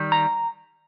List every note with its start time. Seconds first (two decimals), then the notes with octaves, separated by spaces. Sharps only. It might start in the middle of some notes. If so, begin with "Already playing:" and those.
Already playing: D#3 G3
0.12 A#5